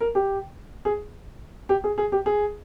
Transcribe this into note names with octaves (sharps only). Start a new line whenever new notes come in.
A#4
G4
G#4
G4
G#4
G#4
G4
G#4